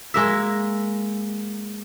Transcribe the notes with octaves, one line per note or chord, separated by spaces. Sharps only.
G#3 A#3 E5